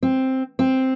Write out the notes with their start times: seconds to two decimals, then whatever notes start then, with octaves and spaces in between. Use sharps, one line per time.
0.03 C4
0.59 C4